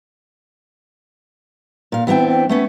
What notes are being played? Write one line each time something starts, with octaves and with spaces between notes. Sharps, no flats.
A#2 F5
E3 B3 C4 D4 G5
A3 B3 C#4